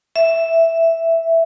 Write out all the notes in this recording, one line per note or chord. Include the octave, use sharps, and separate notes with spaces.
E5